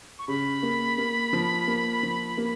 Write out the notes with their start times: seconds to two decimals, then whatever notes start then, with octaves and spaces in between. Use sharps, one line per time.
0.19 C#6
0.28 C#3 B5
0.63 A#3
0.98 A#3
1.33 F3
1.67 A#3
2.03 F3
2.37 A#3